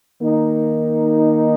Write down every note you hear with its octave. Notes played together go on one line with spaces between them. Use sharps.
D#3 A#3 D#4